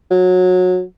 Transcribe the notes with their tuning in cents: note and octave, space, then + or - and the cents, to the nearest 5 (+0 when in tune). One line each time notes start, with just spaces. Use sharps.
F#3 -20